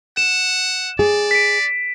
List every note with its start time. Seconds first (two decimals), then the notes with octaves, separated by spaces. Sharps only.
0.17 F#5 E7
0.99 G#4 D5
1.31 B6 D7